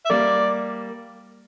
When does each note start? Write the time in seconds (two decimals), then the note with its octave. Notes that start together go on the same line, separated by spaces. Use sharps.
0.06 E5
0.10 G3 A#3 D5